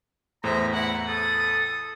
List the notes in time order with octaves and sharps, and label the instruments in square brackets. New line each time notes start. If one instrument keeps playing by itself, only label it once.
[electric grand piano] E2 A2 [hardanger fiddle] C5 E5 [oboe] A#5
[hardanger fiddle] E4 F#5
[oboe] A4 [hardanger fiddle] D#6